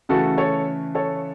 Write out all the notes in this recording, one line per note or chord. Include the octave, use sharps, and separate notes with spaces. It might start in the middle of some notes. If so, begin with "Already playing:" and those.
C#3 E3 A3 F#4 A4
A4 C#5
A4 C#5